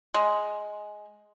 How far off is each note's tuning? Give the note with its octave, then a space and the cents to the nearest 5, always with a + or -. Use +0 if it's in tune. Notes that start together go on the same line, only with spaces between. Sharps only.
G#3 +10